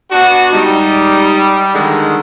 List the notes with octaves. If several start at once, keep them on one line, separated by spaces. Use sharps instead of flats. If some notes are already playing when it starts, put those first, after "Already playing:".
B3 D4 F#4
G3 G#3 D#4
D3 D#3 G#3